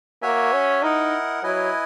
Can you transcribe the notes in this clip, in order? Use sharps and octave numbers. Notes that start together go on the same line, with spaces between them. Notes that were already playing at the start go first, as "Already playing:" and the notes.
A#3 F#4 C#5 E5 G#5
C#4
D#4 E4 A#4 D#5 F#5
F#3 E4 B4 D#5 G#5